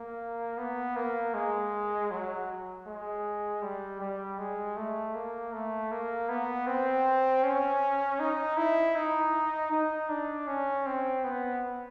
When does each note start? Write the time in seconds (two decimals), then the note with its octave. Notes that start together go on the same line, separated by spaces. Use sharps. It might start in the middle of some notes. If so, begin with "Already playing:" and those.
Already playing: A#3
0.58 B3
0.96 A#3
1.34 G#3
2.11 F#3
2.87 G#3
3.62 G3
4.01 G3
4.39 G#3
4.77 A3
5.14 A#3
5.53 A3
5.91 A#3
6.29 B3
6.67 C4
7.44 C#4
8.20 D#4
8.57 E4
8.95 D#4
9.72 D#4
10.09 D4
10.48 C#4
10.86 C4
11.24 B3